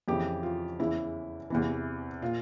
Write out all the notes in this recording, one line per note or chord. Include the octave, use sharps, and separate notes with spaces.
F2 C#3 E3 G4
F4
E2 C#3 E3 E4
E2 C3 E3
A#2 F4